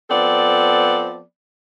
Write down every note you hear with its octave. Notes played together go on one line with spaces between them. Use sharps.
F3 B3 C4 A4 D5